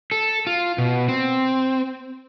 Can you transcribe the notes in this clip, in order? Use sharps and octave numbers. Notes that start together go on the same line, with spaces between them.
A4
F4
B2
C4